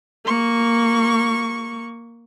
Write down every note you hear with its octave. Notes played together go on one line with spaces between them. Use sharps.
A#3 C#6